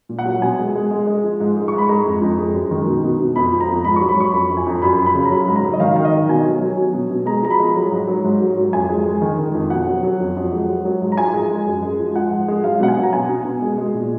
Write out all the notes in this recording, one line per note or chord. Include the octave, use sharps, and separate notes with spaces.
A#2
F#5
F#3
B2 G#5
G#3
G#3
G#3
G#3
F3
G#2
G#3
G#2 C#6
B5
G#3 A#5
F2
F2
G#3
F#2
D#3
B2
B2
B2
F2 B5
F3
A#5
F2
G#2 B5
F#3 C#6
B5
F#3 C#6
F2 B5
F2
G#5
F2 A#5
F#2 B5
F#2
B5
C#3
A#5
F#3 B5
G#2
A#5
F#3
D#5
D#3 F5
D#3
D#5
D#3
B2 G#5
F#3
F#3
F#3
B2
B2
G#3 A#5
F3 A#5
B5
G#3
F#3 A#5
G#2
F#3
G#2
F#3
F#3
F2 G#5
G#3
G#3
D#3
D#3
F2
B2 F#5
F#3
F#3
F2
F2
G#3
F#3
F#3
G#2
A#5
F3 G#5
G#3
G#3
F#2
G#3
F3
F3 F#5
G#2
G#3
F#3 F5
B2 F#5
G#5
F#3
A#5
B2 G#5
B2
B2
G#3
G#3
A#2